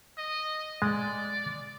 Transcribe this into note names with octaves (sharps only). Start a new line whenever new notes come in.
D#5
G#3 D5